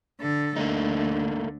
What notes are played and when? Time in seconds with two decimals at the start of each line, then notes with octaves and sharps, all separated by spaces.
0.20 D3 A4
0.56 D2 D3 A3 A#3 D#4